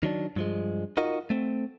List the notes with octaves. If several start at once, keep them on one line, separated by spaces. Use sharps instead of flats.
D#3 F#3 D4
G2 F3 G#3
D#4 F4 F#4 A#4 D#5
A3 C4